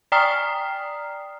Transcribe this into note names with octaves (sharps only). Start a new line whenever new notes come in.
D5 G5 A#5 D#6 F6 C7